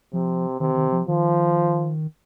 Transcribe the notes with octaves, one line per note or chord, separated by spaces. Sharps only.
C3 F3
C3 D#3
D#3
F3
D#3 F3